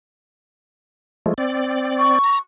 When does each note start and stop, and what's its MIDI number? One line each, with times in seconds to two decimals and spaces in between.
1.26 1.34 53
1.26 1.34 56
1.26 1.34 57
1.38 2.19 60
1.38 2.19 74
1.99 2.39 85
2.24 2.39 82